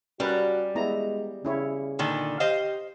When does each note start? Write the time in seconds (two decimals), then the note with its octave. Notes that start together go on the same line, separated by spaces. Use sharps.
0.20 G3 C#4 F#4 A#4 B4
0.75 G#3 B3 E4 A#5
1.45 C#3 C#4 E4 C#5
1.99 A#2 D3 D#3
2.40 G4 C5 D#5 F5